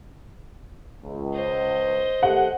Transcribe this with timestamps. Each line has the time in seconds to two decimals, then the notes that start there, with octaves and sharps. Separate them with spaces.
1.03 C#2
1.34 C5 D#5
2.23 D#2 A3 G4 F#5